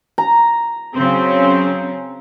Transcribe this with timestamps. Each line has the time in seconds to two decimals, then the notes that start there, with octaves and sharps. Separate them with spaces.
0.18 A#5
0.95 C#3 F#3 C4